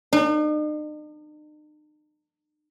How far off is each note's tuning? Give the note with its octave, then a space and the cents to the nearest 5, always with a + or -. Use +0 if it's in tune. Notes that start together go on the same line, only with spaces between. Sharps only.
D#4 -45